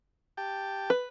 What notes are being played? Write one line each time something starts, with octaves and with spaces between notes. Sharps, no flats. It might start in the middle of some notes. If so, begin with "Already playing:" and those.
G4 G5 A5
B4